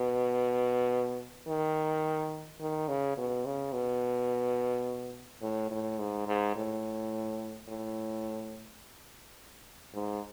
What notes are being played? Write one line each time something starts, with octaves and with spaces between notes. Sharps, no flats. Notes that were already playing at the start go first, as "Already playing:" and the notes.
Already playing: B2
D#3
D#3
C#3
B2
C#3
B2
A2
A2
G#2
G#2
A2
A2
G#2